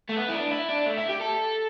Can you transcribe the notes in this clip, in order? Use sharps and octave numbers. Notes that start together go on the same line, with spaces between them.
A3
B3
E4
D4
E4
D4
A3
E4
G4
A4